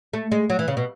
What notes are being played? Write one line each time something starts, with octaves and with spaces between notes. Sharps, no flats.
A3
G#3
F#3
E3
C#3
B2